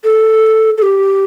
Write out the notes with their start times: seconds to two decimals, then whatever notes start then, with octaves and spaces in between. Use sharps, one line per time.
0.04 A4
0.78 A4
0.82 G4